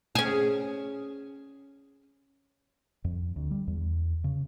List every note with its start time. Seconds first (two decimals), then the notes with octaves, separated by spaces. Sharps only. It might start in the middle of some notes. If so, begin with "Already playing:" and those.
0.15 C#4 G#4
3.04 F2
3.36 D2
3.51 G3
3.67 E2
4.24 C#3